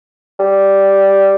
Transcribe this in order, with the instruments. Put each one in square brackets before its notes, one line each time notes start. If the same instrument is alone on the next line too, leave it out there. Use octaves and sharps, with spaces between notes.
[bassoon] G3